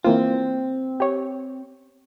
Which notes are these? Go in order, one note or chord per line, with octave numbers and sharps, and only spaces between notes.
E3 A#3 C4 F4
G4 C#5